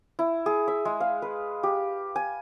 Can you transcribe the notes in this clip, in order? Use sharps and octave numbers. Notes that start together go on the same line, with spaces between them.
E4
G#4
E5
G#3
F5
B4
G4
G#5